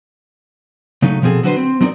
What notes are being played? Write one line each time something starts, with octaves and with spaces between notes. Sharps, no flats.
C#3 F#3 A3 D#4
B2 F3 C4 G#4 A4
D3 F#3 F#4 G#4 B4 C5
C4
F#3 C4 D#4 G#4 A#4 D5